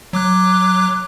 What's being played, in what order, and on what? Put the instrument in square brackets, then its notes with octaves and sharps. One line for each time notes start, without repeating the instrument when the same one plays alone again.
[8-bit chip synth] F#3 D6 F#6